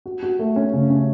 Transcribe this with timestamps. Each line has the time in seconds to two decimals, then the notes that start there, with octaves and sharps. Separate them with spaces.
0.06 F#4
0.23 F#4
0.39 A3
0.56 C#4
0.73 C#3
0.90 C#4